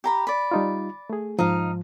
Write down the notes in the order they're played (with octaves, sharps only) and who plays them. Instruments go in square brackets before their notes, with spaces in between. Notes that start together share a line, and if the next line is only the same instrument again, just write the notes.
[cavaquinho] G4 A#5 B5
D5 B5
[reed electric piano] G3 D#4 F4
A3 G#4
[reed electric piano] G#2 F3 [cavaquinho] D#4 F5